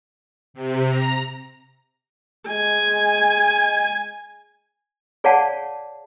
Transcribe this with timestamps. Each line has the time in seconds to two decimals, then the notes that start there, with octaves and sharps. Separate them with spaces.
0.54 C3
0.88 A#5
2.49 G#3 G#5
5.24 G#4 C#5 D5 F5 F#5 A5